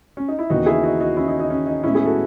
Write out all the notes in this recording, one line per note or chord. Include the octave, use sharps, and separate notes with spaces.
C#4
D#4
E4
D#2 C#3 E3 B3 D#4 F#4
E4 G#4
D#4 F#4
D#4 F#4
C#4 E4
D#4
D#4
C#4
D#4
A2 G#3 B3 C#4 E4
E4 G#4
F#4 A4